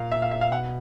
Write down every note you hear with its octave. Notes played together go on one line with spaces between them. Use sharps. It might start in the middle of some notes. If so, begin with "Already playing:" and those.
Already playing: A#2 F5
E5
F5
E5
F5
B2 F#5